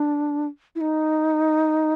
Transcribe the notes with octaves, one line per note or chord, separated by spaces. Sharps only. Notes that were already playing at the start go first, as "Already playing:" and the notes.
Already playing: D4
E4
D#4